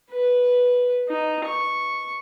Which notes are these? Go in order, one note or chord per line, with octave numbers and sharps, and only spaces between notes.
B4
D#4
C#6